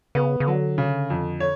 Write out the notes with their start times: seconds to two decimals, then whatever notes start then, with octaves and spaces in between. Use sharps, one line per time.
0.15 C#3 B3
0.40 C#3
0.47 D3 F#3
0.78 C#3
1.10 F2
1.40 C#5